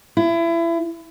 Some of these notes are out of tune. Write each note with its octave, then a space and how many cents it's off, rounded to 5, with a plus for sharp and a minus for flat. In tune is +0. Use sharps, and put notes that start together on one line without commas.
E4 +30